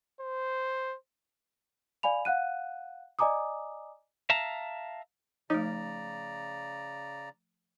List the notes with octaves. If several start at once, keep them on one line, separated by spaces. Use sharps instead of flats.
C5
D5 F5 G#5 B5 F7
F5 F#5 F#6 D#7
D5 D#5 G#5 A#5 D6 D#6
E5 F5 A5 A#5
C#3 F3 A3 D#4 D5 A#5